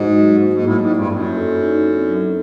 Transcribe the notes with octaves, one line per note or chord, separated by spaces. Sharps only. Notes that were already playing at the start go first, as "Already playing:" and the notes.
Already playing: G#2 D#4 F#4
F#3
A#3
G#2
A2 E4
G#2
D5
G2
F2
F#2 E4
A4
D#4
C4
F#3